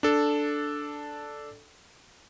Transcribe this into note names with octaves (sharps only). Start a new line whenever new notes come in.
D4 A4